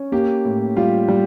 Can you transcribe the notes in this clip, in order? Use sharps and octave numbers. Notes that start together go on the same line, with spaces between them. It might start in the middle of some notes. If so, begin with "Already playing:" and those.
Already playing: C#4
A#3 G4
A2
G3 F4
G3